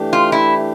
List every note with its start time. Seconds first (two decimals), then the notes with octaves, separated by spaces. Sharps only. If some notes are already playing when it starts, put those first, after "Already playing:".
Already playing: E3 A3 D4 G4
0.13 F4
0.32 E4